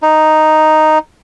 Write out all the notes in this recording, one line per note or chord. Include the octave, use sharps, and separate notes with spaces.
D#4